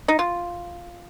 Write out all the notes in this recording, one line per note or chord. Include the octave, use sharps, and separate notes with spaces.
D#4
F4